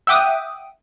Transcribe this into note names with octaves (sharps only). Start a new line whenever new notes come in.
E5 F#5 G5 D6 D#6